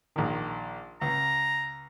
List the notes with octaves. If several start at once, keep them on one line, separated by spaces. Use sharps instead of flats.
A#1 D#3
C#2 A#5